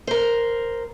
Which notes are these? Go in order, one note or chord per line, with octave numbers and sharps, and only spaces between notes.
A#4 C5